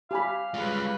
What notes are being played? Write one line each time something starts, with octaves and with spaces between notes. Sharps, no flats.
G4 F5 G#5 B5
G3 G#3 F4 B4